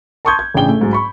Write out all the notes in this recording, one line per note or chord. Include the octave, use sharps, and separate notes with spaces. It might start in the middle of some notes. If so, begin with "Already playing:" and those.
A5 C6 C#6 D#6 G6 G#6
G#6
A1 C#3 D4 G#4 G5 G7
A3
G#2 F#3 G#4
B5 C#6